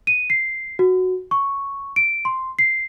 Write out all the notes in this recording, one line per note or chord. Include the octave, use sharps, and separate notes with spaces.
D#7
C7
F#4
C#6
D7
C6
C7